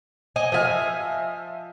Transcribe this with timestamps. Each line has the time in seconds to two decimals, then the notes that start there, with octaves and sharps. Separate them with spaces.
0.36 D#5 G#5
0.52 F3 D#5 E5 G#5 F6